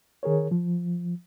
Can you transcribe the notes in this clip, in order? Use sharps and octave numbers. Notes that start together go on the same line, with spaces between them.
D#3 G#4 A#4 C#5
F3